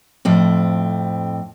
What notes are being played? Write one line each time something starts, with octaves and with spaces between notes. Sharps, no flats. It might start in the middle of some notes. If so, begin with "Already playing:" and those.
F2 A2 C4